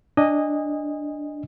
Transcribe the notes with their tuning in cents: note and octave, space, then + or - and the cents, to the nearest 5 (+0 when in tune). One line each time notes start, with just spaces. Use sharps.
D4 +0 D#5 +0 G#5 -30